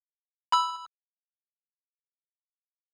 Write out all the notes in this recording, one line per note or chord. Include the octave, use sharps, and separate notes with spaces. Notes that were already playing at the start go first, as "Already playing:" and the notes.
B5 E6